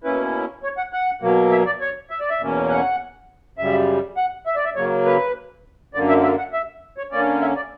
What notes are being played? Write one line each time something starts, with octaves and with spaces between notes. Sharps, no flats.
B2 A#3 C#4 E4 B4
C#5
F#5
F#5
B2 F#3 A#3
E5
D5
C#5
E5
D5
E5
E2 B2 A#3 C#4
F#5
F#2 C#3 G3 E5
F#5
E5
D5
E5
C#3 F#3 A#3 C#5
B4
F#2 D3 A#3 D5
E5
E5
F#5
E5
C#5
D3 A#3 C#4 D5
E5
D5